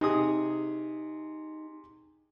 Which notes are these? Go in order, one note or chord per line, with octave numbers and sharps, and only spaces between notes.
C3 D#4 G#4 D#6